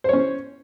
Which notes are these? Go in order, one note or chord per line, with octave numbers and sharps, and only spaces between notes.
C#4 C5 C#5